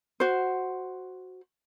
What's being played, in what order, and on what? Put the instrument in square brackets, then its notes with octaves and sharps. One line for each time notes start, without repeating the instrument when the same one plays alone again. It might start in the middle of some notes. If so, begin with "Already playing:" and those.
[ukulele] F#4 C5